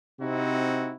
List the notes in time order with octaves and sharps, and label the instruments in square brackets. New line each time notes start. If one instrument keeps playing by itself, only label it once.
[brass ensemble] C3 C4 D#4 E4 F#4